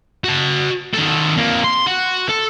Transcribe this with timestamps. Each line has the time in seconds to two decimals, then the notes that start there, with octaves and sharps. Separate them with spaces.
0.24 F#4 A5
0.94 D#3 A4
1.37 F2 A#3
1.64 C6
1.86 F#4
2.29 A4